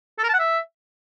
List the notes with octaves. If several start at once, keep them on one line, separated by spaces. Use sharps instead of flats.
A4
A#4
A5
F#5
E5